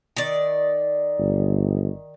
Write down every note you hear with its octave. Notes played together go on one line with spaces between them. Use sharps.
D#3 D5
G1